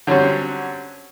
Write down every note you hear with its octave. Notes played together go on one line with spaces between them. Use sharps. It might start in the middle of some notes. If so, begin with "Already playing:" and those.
D3 F#3 G3 C4 C#4